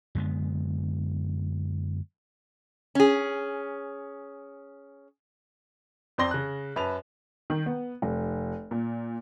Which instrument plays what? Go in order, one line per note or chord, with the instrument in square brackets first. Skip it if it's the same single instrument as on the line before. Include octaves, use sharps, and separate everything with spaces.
[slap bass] F#2 D3 G#3 B3
[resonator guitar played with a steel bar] C#4 G#4
[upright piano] F2 C4 D5 C6 A#6 G7
C#3 F#6
F#2 B4 A5 F7
[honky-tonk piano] D#3
B3
F1
A#2